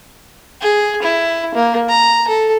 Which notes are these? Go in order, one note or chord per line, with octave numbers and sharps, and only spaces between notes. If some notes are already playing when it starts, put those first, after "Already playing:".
G#4
E4
A#3
A#5
A4